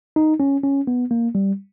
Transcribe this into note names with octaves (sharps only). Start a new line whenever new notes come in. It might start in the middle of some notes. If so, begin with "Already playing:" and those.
D#4
C#4
C#4
B3
A#3
G3